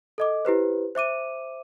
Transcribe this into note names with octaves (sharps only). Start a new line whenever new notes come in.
A4 D#5 D6
E4 G4 B4 C5
C5 E5 D6 D#7